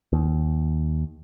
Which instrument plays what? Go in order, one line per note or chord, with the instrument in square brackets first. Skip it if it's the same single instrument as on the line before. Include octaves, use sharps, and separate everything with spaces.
[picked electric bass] D#2